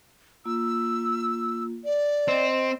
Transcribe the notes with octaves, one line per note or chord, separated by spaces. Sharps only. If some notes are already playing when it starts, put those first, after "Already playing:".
A#3 F4 E6
D5
C4 D#5